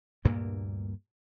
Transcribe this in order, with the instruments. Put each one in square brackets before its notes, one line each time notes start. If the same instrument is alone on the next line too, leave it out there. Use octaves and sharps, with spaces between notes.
[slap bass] D2 G2 A#2 A#3